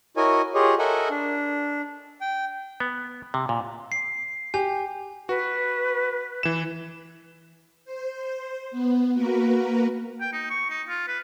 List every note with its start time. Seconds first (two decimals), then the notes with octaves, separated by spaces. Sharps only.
0.17 E4 F#4 A#4 C#5 D#5 G#5
0.54 F4 G4 G#4 C#5 D#5
0.79 A4 A#4 D#5 E5 F#5 G#5
1.10 D4
2.21 G5
2.80 B3
3.34 C3
3.49 A#2
3.92 C7
4.54 G4 G#5
5.29 F#4 B4
6.43 E3 E7
7.85 C5
8.71 B3
9.13 A#3 F#4 A#4 B4
10.21 G5
10.33 D#4
10.50 C#6
10.70 D#4
10.89 F4
11.08 B4